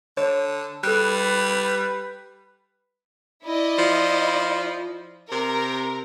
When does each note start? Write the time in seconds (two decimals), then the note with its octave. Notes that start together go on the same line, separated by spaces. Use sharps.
0.17 D3 C#5
0.84 G3 A4 B4 F#6
3.46 E4 D5 D#5
3.78 F3
5.32 C3 A#4